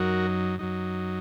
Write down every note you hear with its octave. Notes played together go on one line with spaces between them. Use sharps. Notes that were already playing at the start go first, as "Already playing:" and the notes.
Already playing: F#2 F#3 D#4 F#4 A#4
F#2 F#3 D#4